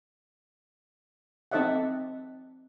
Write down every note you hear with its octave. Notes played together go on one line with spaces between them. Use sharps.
C4 D#4 A4 D5 E5 F#5